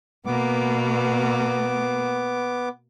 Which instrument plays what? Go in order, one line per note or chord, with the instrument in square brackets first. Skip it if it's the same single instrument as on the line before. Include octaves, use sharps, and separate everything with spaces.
[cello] B2 A#3 [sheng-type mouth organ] B3 D6